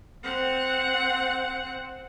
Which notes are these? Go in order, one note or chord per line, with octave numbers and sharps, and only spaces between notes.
C4 F#5